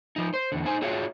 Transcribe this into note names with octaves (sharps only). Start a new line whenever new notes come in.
F3 D#4
C5
E2 D3
A3 D#4 C5 G#5
F4 F#4 G#4 C#5 E5 F5